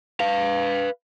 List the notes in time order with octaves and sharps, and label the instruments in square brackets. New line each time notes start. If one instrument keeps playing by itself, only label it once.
[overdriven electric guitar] B4 F5